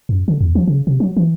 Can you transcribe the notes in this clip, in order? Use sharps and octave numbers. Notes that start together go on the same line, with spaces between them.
F#2
D3
E2
F3
C#3
C3
F#3
E3